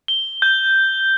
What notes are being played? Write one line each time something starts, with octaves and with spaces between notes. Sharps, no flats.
G7
G6